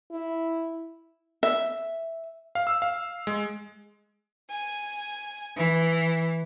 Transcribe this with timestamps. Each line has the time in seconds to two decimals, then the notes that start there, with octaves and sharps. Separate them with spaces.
0.12 E4
1.43 E5
2.55 F5
2.67 E6
2.82 F5
3.27 G#3
4.50 G#5
5.56 E3